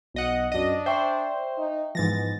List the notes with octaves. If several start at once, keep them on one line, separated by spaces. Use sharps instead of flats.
B1 D#5 F#5
F#2 D4 D#5
C5 E5 G5 C#6
D#4
G#2 E3 F3 B3 A6 A#6